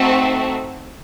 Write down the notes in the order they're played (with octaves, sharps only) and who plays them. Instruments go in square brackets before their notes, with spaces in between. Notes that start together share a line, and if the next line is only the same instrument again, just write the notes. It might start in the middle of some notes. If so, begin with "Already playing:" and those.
Already playing: [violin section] A3 C4 D#4 F#4 A4